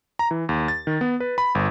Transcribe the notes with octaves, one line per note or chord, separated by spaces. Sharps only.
A#5
E3
D#2
A6
D#3
B3
B4
B5
G1